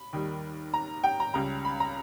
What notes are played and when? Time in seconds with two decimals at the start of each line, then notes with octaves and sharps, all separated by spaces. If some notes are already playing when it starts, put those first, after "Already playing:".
Already playing: B5
0.13 D#2 D#3 G3
0.74 A#5
1.04 G5
1.20 A#5
1.34 C#2 C#3 G3 A#5
1.65 B5
1.80 A#5